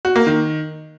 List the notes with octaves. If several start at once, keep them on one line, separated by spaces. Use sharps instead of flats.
F#4
A#3
D#3